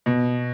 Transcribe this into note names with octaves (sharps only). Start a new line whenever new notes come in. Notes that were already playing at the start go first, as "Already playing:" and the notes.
B2